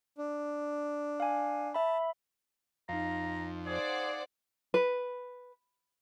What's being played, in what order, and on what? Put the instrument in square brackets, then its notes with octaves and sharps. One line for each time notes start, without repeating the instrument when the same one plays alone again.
[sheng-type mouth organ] D4
[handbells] F5 G#5
[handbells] E5 B5 [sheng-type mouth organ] A5
[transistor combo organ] F2 [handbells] D#4 F5 [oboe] A#5
[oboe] G#4 [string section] C5 D5 F#5
[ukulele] B4